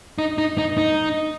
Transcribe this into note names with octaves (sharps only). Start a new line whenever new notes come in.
D#4
D#4
D#4
D#4